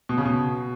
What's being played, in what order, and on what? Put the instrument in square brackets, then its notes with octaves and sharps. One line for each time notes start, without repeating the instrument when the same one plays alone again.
[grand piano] B2
C#3
B2